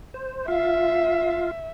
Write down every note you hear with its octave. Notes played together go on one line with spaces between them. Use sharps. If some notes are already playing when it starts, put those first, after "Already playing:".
C5
F4 E5 F5